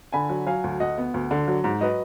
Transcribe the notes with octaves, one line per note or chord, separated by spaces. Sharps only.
D3 G#5 B5
F#3
F#3 F5 G#5
D2
D2 D#5 F#5
B3
D2
D3
F#3
G#2
F#3 B4 D#5